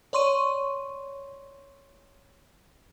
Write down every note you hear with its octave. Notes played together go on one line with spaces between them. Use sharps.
C#5 D5 C6 C#6 D#7